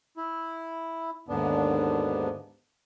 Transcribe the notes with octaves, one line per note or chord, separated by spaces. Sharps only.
E4
D#2 G#2 D3 B3 D4